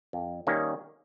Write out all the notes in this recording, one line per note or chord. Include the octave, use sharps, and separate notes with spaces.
F2
D#3 G3 A#3 C#4